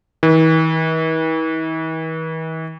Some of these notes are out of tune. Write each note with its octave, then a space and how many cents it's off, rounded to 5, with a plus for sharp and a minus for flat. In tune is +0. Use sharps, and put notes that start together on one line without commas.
E3 -45